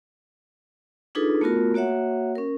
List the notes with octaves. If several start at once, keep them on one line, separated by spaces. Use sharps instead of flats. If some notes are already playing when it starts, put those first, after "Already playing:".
D4 D#4 F4 G#4 A4 B4
A3 B3 F4 F#4 A#4
A#3 F#4 C#5 E5 F#5
C#4 A#4